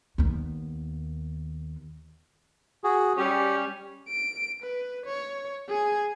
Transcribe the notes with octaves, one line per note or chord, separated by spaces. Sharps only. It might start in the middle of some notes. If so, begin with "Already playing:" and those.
D#2 B3
F#4 G#4
G3 C#4 G4
D7
B4
C#5
G#4 G#5